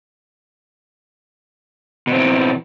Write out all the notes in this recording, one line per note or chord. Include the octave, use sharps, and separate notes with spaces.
B2 E3 C4